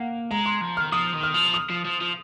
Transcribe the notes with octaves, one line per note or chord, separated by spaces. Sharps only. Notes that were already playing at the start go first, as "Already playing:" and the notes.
Already playing: A#3 F5 F#5
G#3 A#5
C6
F3
D#3 F6
F3 D#6
D#3
F6
F3
D#6
F3
F3
F3